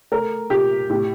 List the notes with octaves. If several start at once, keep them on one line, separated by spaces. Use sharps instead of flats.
A3 A#4
A#2 G4
A2 G4